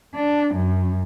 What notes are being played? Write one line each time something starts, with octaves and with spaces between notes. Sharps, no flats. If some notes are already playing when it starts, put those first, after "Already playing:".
D4
F#2